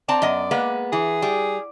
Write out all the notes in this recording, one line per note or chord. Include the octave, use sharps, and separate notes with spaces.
C4 D5 A5 A#5
F#2 B3 D#5
G#3 A#3 B3
E3 G#4
G3